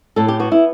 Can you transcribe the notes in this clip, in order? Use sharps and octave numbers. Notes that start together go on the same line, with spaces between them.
A2 A4
G4
B3 F#4
E4